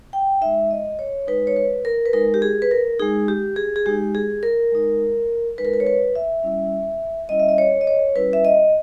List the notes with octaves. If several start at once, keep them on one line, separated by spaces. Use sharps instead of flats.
G5
G#3 D#4 E5
D#5
C#5
G#3 D#4 B4
C#5
B4
A#4
B4
G#3 D#4 A#4
G4
G#4
B4
A#4
G#3 D#4 G#4
G4
G#4
G#4
G#3 D#4 G4
G#4
A#4
G#3 D#4
G#3 D#4 B4
A#4
B4
C#5
B4
E5
G3 C#4 E4
G3 C#4 E4 D#5
E5
D#5
C#5
D#5
C#5
G3 C#4 E4 B4
E5
D#5